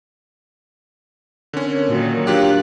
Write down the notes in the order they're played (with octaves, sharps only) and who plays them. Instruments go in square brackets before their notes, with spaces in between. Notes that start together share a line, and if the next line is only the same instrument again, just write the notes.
[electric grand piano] D3 C#4 [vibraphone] C4 A#4 C#5
[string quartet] A#2 D#3 F#3 [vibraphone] F#4
[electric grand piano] F#3 F4 G4 [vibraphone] D4 F5 [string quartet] F#6